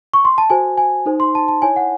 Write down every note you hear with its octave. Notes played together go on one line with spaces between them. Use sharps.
C#6
C6
A5
F#4 A4 C5 G#5
G#5
D#4 A4 C5
C6
A5
A5
E4 A4 C#5 G#5
F#5